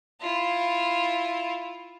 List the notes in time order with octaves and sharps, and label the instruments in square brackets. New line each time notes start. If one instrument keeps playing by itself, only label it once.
[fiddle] E4 F4